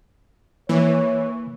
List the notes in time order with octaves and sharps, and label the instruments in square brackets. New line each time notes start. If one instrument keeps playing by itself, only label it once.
[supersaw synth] E3 [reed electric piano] A#3 [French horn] C#5